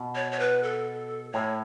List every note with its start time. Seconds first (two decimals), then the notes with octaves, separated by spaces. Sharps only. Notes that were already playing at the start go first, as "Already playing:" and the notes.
Already playing: B2
0.15 C#5
0.32 C#5
0.39 B4
0.63 A4
1.33 A2 C#5